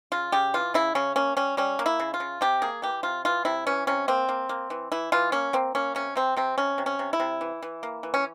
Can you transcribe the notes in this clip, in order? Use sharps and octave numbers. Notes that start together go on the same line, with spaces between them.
C#3 F4
C#3 G4
E3 F4
C#3 E4
C#3 C#4
A#3 C#4
G3 C#4
G3 C#4
A#3
E4
C#3
F4
C#3
C3 G4
A#3 G#4
E3 G4
C3 F4
E3 F4
C3 E4
E3 C#4
C3 C#4
A#3 C4
A#3
A#3
E3
E3 E4
E3 F4
A#3 C#4
A#3 C4
A#3 C#4
C3 C#4
C3 C4
C3 C4
C3 C#4
C3
C#4
C3
E4
C3
E3
E3
A#3
E3
C#4